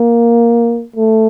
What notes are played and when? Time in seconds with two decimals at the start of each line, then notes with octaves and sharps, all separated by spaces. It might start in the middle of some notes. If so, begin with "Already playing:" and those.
Already playing: A#3
0.96 A3